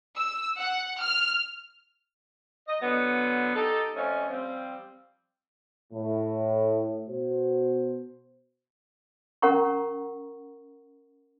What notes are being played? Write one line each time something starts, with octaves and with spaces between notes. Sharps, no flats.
E6
F#5
F6
D#5
D3 F#3 B3
D#4 G4 A4
F2 A3 C#4
F3 G3 C4
A2
B2 F#4 C5
C#4 A#4 F#5 A#5 C#6